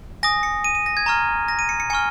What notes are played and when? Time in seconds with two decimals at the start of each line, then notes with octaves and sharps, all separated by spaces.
0.23 G#5 D#6 A#6
0.43 C#7
0.64 D#7
0.75 D#7
0.86 A#6
0.97 G#6
1.06 A#5 C#6 F6
1.48 A#6
1.59 D#7
1.69 C#7
1.80 C#7
1.90 G#5 C#6 F6 C#7